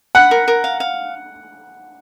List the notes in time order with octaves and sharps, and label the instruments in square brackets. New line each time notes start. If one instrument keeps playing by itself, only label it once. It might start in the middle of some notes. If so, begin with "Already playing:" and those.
[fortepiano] F#5 [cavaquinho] B5
[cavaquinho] A#4
A#4
F5
F5